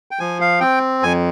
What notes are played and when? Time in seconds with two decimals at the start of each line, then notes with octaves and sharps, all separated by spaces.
0.11 G5
0.19 F3 G#5
0.41 F5
0.60 C4 G5
1.03 F2 G#5